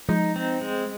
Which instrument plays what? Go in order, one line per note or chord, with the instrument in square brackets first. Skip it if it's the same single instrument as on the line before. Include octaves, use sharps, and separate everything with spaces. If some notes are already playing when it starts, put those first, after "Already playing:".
[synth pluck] F3 G#3 [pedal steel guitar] D#4
[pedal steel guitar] C4
G#3